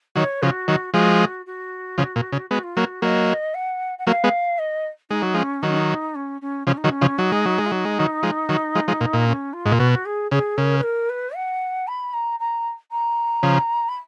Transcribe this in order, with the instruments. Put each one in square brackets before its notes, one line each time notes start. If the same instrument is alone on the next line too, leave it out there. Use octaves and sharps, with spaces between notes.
[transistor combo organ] D#3 F#3 [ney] C#5
[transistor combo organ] C#3 F3 [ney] F#4
[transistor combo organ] D#3 F#3
[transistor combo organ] F3 G#3 [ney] F#4
[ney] F#4
[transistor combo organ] C#3 F3
A#2
C#3
[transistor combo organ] G#3 B3 [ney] F#4
[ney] F4
[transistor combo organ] F#3 A#3 [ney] F#4
[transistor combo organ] F#3 A#3 [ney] D#5
[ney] F#5
F#5
[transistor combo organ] F#3 A#3 [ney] F5
[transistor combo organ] G#3 B3
[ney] D#5
[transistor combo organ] G#3 [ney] D#4
[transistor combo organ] F#3
[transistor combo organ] F3 G#3 [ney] C#4
[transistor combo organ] D#3 F#3 [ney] D#4
[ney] C#4
D#4
C#4
C#4
[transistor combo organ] C#3 F3 [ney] C#4
[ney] D#4
[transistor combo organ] D#3 F#3
[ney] C#4
[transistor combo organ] C#3 F3
[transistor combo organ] F#3 [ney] D#4
[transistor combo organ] G#3
F#3
G#3
[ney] F4
[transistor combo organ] F#3 [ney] D#4
[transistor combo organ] G#3
D#3 F#3
F3 G#3
D#3 F#3
F3 G#3
F3 G#3
A#2
A#2
[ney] C#4
F4
[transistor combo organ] G#2
A#2
[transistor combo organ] B2 [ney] F#4
[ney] G#4
[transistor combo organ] C#3 [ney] G#4
[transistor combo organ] C#3 [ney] A#4
[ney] B4
A#4
B4
F#5
B5
A#5
A#5
A#5
[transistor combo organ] C#3 F3
[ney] B5